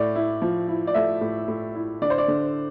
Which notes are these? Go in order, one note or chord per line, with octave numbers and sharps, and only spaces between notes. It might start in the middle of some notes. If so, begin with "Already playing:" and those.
Already playing: A2 D5
E4
F3
E4
D5
A3 E5
A2
A2
E4
D3 D5
C5
D5
D3